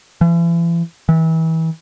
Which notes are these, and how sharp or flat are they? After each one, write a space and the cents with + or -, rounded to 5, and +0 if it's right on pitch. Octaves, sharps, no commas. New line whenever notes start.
E3 +40
E3 -35